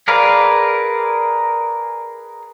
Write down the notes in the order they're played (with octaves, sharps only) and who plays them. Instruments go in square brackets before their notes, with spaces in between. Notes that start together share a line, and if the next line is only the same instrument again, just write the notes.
[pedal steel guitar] G#4 A#4 B4 D5 F5